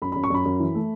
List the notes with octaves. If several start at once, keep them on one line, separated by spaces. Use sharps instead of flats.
F#2 B5
F#2 B5
C#6
F#2 B5
F#2
E3
A3